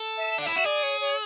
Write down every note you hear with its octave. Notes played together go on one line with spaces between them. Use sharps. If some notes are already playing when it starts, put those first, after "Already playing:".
Already playing: A4
E5
D4 F#5
E4 E5
F#4
G#4 D5
C#5
C#5